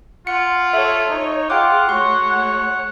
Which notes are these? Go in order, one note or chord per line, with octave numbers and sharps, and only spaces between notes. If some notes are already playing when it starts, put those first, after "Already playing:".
F4 F#5 C#7
A4 C#5 E5
D#4 C#5
F4 G#4 F#5 G5 D6
A3 F#4 C#5 C6
F#5